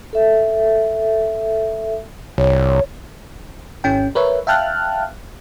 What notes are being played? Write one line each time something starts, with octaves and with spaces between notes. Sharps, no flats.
A4 E5
C2 C#5
G#1 C#4 G5
A#4 B4 C#5 E5
E5 F5 G5 A5 F6 F#6